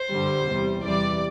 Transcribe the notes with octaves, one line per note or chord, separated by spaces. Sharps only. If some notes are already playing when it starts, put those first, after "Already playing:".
Already playing: C5
G2 D3 G3
E2 C3 G3
E2 C3 E3 G3 D5